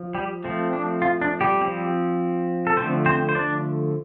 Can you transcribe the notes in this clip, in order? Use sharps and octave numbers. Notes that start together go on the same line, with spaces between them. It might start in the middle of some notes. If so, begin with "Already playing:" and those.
Already playing: F3
G3 G4
F3 A3 C4
D4
F4
D4
G3 G4
F3 C4
A4
D3 F3 A3 C4 C5
C4 C5
C5
D4 D5